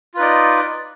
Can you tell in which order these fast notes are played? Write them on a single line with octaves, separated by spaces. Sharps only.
F4 B4 D#4 D5